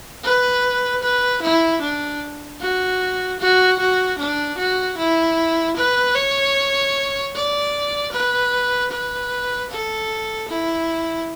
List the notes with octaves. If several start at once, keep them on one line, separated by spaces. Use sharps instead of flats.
B4
B4
E4
D4
F#4
F#4
F#4
D4
F#4
E4
B4
C#5
D5
B4
B4
A4
E4